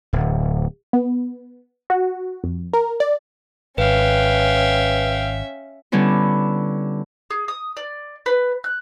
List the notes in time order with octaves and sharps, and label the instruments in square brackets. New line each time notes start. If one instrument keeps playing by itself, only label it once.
[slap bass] D1
[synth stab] B3
F#4
F2
A#4
D5
[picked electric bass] G#1 [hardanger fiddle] C#4 E5 [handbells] B4 [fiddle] F5 G5
[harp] D3 G3 B3 C#4 E4
[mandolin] G#4
D#6
D5
B4
F#6